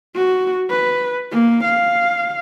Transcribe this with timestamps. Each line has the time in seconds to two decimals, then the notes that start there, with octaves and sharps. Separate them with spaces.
0.16 F#4
0.70 B4
1.32 A#3
1.64 F5